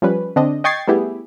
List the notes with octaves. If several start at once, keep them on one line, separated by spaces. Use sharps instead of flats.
F3 G3 C#4 B4
D3 C4 D4 D#5
D#5 G5 C#6 G#6 A6 C7
G3 A3 B3 E4 G4 G#4